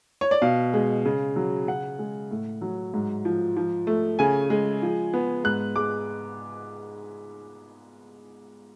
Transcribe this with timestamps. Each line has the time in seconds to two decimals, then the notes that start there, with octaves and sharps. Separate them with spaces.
0.21 C#5
0.31 D5
0.42 B2 F5
0.74 G#3
1.05 C#3
1.36 F#3
1.68 C#3 F#5
1.99 G#3
2.31 A2
2.62 F#3
2.94 G#2
3.25 F3
3.56 F3
3.87 A3
4.19 C#3 G#5
4.50 G#3
4.82 F3
5.14 B3
5.44 G#2 F#6
5.76 G#3 D6